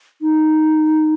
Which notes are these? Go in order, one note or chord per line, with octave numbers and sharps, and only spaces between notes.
D#4